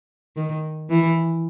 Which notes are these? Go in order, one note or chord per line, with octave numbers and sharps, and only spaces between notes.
D#3
E3